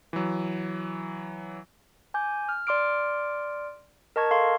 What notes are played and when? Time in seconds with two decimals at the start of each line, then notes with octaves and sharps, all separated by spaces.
0.13 E3 F#3
2.14 G#5 D6 G6
2.49 F6
2.67 D5 C6 D6 F6 D7
4.16 A#4 D#5 A5 C#6 G#6
4.31 A4 F5 C6 C#6